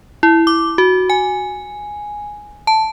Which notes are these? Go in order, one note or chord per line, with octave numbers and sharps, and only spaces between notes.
E4
D6
F#4
G#5
A5